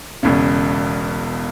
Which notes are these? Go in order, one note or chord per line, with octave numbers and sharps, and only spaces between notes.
E1 E2 C#3